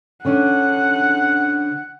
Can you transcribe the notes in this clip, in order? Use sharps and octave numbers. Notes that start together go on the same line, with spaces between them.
D3 C#4 D4 F#5